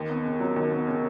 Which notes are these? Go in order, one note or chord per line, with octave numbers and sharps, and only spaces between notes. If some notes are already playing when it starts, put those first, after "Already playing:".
Already playing: D#2
B3
C#3
F#3
D#2
B3
C#3